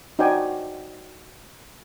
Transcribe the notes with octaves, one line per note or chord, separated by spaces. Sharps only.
D#4 F#4 C5 D5 G5 G#5